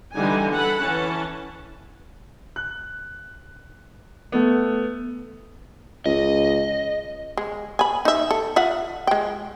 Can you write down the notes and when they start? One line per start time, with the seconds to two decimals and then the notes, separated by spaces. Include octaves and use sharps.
0.14 D3 E3 G3 D#4 G#5
0.52 A4 F#5 B5
0.81 E3 C#4 A5
2.56 F#6
4.32 A3 B3
6.06 C#2 D#5
7.37 G#3
7.79 G#5 B5
8.05 D#4 E5
8.31 A4
8.56 F4 E5 F#5
9.07 G#3 G5